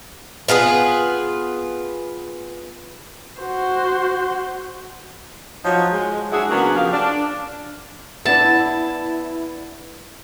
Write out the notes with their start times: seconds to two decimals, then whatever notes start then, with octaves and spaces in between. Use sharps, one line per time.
0.48 B3 F4 G#4 B4
3.41 F#4 C5
5.65 F3 F#3 D#4 F#4 C#5
5.93 G#3
6.32 F#3 D4 E4 F#4 G#4
6.50 C#3 F#3 A#3 B3 D4 F#4
6.76 F3 G4 A#4 F5
6.93 D4
8.25 B3 D4 E4 A5